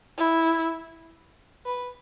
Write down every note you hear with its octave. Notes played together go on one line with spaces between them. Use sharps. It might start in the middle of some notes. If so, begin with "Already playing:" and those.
E4
B4